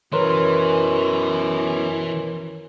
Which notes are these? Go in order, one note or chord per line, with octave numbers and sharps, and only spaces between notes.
F#2 B2 E3 A#4 B4 C#5 C6